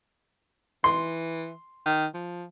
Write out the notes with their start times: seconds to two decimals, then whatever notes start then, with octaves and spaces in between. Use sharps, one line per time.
0.84 E3 C6
1.85 D#3
2.14 F3